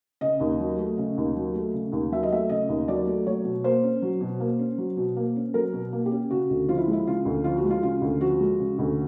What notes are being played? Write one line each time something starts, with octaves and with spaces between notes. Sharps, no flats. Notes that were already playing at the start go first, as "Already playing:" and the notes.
C#3 D#5
D#2
F#3
A3
C#3
D#2
F#3
A3
C#3
D#2
F#3 E5
D#5
A3 E5
C#3 D#5
D#2
F#3 D5
A3
F#3 C#5
B2
A#3 C5
C#4
F#3
B2
A#3
C#4
F#3
B2
A#3
C#4
F#3 A#4
B2
A#3
G4
C#4
C#3 F#4
D2
F3 F4
E4
G#3
E4
C#3 F4
D2
F3 F4
F#4
G#3
F4
C#3 F4
D2
F3 F#4
G#3
C#3
D2